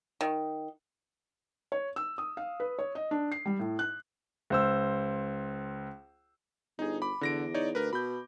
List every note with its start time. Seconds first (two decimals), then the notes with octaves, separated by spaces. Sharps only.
0.21 D#3
1.72 C#5
1.96 E6
2.18 D#6
2.37 F5
2.60 B4
2.79 C#5
2.95 D#5
3.11 D4
3.32 C7
3.46 G3
3.59 A2
3.79 F#6
4.50 C#2 C5 E6
6.79 G1 D#4 G#4
7.02 B5 D6
7.21 E2 D3 A#6 D7
7.54 D#4 C#5 D5
7.75 D2 A#4 B4
7.93 B2 B5 G6